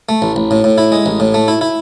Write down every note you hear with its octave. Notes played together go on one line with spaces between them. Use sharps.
A3
A1
A1
A2
A2
E4
G#3
A1
A2
A3
E4
E4